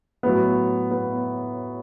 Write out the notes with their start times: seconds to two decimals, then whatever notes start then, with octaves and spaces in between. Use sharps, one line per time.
0.23 A2 F#3 B3
0.91 B3